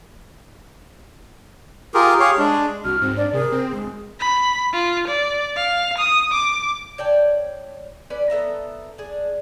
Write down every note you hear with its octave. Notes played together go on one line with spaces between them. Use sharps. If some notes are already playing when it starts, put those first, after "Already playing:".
F4 G4 G#4 A#4
G4 G#4 C#5 F5
G#3 D4
C2 F#4 F6
G#2 C4
D4 D5
C3 G#4 A#4
C4
D1 G#3
B5
F4
D5
F5
D#6
D6
C#5 D5 G5 A5
C#4 B4 D5
B3 A4 E5 A#5
D4 G#4